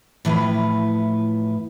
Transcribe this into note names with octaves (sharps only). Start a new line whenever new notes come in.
A2 E3 F3 B3 B4